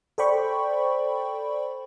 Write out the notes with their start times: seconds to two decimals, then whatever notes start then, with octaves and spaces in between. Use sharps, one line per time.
0.18 A4 C5 D5 G5 B5 C#6